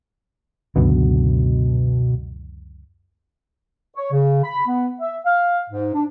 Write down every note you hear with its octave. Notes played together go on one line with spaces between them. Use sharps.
C#2 F#2 B2 D3
C#5
C#3
B5
B3
E5
F5
G#2
D4